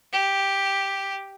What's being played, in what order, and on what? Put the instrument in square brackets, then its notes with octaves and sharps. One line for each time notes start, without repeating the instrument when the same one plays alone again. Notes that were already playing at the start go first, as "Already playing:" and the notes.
[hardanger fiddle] G4